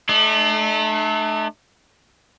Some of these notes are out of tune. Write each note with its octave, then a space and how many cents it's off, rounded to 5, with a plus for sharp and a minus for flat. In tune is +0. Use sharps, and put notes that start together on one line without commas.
A3 -30 D4 +45